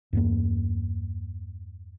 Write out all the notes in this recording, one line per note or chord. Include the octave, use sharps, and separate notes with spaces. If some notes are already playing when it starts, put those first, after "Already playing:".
E2 G2 A#3